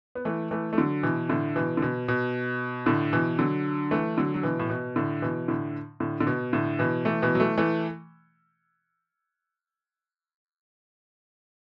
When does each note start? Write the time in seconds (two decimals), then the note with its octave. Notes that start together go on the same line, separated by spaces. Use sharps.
0.15 B3
0.25 E3 A3
0.51 E3 A3
0.73 A3
0.78 D3 F#3
1.03 B2 E3
1.29 A2 D3
1.56 B2 E3
1.77 D3
1.82 B2
2.08 B2
2.86 A2 D3
3.13 B2 E3
3.39 D3 F#3
3.91 E3 A3
4.17 D3 F#3
4.34 F#3
4.43 B2 E3
4.59 A2
4.70 B2
4.96 A2 D3
5.22 B2 E3
5.48 A2 D3
6.00 A2 D3
6.20 D3
6.27 B2
6.53 A2 D3
6.79 B2 E3
7.05 E3 A3
7.22 B2 E3
7.35 F#3
7.40 E3 A3
7.58 E3 A3